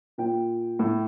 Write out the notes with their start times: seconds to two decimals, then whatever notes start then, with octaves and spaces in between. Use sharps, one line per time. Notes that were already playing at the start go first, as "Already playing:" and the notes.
0.18 A#2 G5
0.79 A2